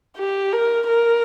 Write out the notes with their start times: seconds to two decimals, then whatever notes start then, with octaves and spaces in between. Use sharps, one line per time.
0.18 G4
0.53 A#4
0.87 A#4